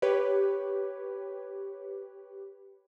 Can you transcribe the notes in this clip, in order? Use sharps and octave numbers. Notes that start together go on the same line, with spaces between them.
G4 B4 C#5